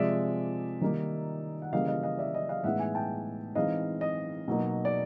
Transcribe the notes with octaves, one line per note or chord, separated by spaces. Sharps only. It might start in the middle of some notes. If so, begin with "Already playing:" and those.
Already playing: C3 F3 G#3 D5 E5
D#3 G3 A#3 D#4
F#5
C#3 E3 G3 A#3 D#5 F5
D#5 F5
D#5 F5
D5 E5
D#5
D#5 F5
A2 E3 G#3 B3 D#4 E5 F#5
F#5 G#5
G5 A5
E3 G#3 C4 D#4 D#5 F5
D#5
B2 F#3 A#3 D#4
D5